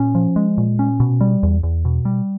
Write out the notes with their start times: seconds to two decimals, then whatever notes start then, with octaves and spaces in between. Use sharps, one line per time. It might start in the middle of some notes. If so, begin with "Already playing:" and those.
Already playing: A#2 C#4
0.15 F3
0.36 G#3
0.58 A#2
0.79 C#4
1.00 B2
1.21 G3
1.43 E2
1.63 E2
1.85 B2
2.05 G3